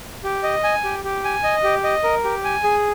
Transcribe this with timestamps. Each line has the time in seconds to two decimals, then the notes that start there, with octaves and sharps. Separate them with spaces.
0.24 G4
0.43 D#5
0.64 G#5
0.84 G4
1.04 G4
1.24 G#5
1.44 D#5
1.64 G4
1.84 D#5
2.03 A#4
2.24 G4
2.44 G#5
2.64 G#4